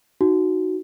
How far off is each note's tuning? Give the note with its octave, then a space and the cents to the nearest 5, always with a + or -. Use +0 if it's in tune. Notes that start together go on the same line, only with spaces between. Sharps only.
D#4 +0 F#4 +0